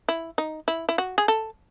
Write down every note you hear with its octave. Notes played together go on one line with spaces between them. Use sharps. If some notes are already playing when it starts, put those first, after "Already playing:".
E4
D#4
E4
E4
F#4
G#4
A4